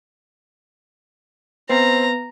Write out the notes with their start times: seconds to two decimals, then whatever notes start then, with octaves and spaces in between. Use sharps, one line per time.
1.69 B3 C4 B4 A#5